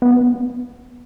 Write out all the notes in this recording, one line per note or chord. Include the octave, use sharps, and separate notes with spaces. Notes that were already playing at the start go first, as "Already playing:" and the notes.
B3